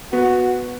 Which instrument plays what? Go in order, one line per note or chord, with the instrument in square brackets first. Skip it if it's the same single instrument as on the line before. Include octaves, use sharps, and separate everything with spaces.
[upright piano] B3 [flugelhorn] F#4